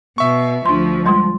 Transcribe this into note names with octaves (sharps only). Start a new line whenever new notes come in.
B2 E5 C#6
D2 F3 D4 C6
G3 G#3 F4 D#5 C6